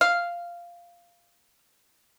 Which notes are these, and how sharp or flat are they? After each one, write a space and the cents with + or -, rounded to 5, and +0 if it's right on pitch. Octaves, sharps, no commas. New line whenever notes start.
F5 -5